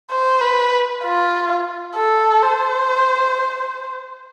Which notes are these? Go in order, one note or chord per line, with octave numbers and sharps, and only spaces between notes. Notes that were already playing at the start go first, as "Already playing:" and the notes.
C5
B4
F4
A4
C5